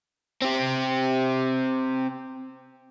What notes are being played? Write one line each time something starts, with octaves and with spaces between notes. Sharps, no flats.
C4 G4